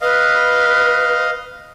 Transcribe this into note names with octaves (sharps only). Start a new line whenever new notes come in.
B4 D#5 F5